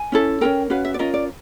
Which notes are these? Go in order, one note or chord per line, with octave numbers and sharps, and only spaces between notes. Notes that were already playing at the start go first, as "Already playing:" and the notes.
Already playing: G#5
C#4 E4 A4
C#4 F4 A#4 G5
C#4 F#4 B4 F5
E5
D5
C#4 F4 A#4 D#5
D5